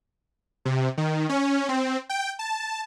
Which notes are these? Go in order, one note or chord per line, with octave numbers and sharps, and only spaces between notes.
C3
D#3
C#4
C4
G5
A5